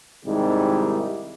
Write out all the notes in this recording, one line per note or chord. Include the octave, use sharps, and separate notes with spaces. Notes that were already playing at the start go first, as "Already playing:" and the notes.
G#2 C3 D#3 G3 E4 G4